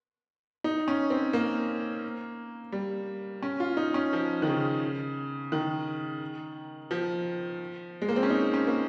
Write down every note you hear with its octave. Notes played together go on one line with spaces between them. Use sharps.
D#4
C#4
C4
A#3
G3
C#4
F4
D#4
C#4
F3
D#3
C#3
D#3
F3
G#3
A#3
C4
C#4
D#4
C#4
A#3